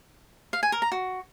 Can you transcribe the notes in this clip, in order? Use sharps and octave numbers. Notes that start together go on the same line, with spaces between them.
F5
G#5
A#4
A#5
F#4